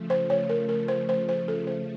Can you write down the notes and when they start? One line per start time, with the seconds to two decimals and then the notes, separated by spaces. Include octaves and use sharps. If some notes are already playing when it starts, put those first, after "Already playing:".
Already playing: C#3 F3 A3
0.10 C5
0.30 C#5
0.49 A#4
0.69 A#4
0.88 C5
1.09 C5
1.29 C5
1.48 A4
1.67 C5